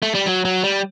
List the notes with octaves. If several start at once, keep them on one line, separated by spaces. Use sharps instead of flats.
A3
G3
F#3
F#3
G3